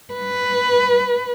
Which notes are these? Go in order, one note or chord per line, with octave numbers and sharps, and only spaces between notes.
B4